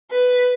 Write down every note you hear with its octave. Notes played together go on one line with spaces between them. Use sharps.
B4